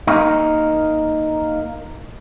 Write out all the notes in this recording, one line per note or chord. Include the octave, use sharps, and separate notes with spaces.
A#3 D#4